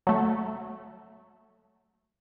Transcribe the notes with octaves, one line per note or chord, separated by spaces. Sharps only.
F#3 A3